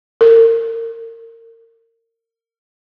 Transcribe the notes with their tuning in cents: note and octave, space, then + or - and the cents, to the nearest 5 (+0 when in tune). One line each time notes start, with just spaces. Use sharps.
A#4 -30